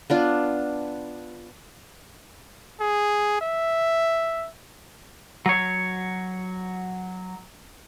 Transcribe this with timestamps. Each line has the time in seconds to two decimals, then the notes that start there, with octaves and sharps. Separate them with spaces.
0.10 B3 D4 F4
2.80 G#4
3.41 E5
5.46 F#3 C#5